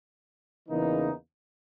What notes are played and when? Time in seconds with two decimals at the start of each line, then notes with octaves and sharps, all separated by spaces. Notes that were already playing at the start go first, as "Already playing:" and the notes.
0.68 E2 C#3 E3 A#3 D#4